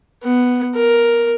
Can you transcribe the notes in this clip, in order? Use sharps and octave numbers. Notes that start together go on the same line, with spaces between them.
B3
A#4